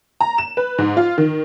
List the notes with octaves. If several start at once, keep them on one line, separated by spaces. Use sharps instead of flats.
A#5
E7
B4
G#2
F4
D#3